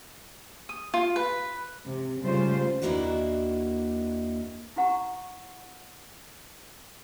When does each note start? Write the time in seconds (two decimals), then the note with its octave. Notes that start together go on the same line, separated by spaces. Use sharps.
0.69 D#6
0.94 F4
1.16 B4
1.86 C3
2.22 C#3 G3 A3 F4 C5
2.82 D#2 D#3 A#3 D4 E4 F#4
4.76 E4 G4 F#5 A#5 C#6